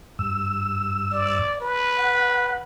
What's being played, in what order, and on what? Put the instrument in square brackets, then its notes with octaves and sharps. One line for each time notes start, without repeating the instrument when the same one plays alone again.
[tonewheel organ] G2 E6
[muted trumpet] D5
B4
[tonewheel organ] F#5